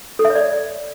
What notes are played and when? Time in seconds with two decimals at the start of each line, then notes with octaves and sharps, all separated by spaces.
0.19 A4
0.25 E5
0.30 C#5
0.35 D5